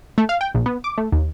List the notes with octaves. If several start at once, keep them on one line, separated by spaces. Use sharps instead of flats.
A3
F5
G5
A#1
B3
D6
A3
D#2